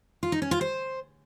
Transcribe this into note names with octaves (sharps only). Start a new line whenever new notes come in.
F4
D#4
C#4
F4
C5